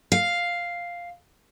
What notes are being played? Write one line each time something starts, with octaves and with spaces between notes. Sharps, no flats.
F5